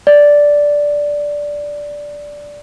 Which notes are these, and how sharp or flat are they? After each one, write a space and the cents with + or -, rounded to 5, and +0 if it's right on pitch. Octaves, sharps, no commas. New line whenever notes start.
D5 -5